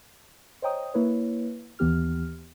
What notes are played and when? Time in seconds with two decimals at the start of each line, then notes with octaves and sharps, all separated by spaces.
0.62 C5 C#5 D#5 G5 A#5 D#6
0.94 A#3 E4 B4 C#5
1.79 D#2 E3 B3 G4 F6